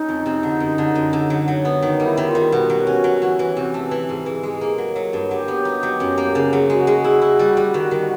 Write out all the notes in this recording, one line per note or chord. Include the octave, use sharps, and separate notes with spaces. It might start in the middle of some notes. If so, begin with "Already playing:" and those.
Already playing: A3 C#4 D#4
F2
C3
D3
F#2
D3
F#2
D3
F#3
F#3
B3
D#3 D#4
G3
E4
D#3
F4
G3
B2 F#4
F#3
C#4
F#3
E3
E3
C3
A3
E3
G#2
E3
G#3
A#3
F#3
F#3
G2
F#3 G4
B3
D#4
F#3
F#2
A#3
C#3
F#3
G#3 F#4
G#3
E4
E4
G3
G3
D#3
D#3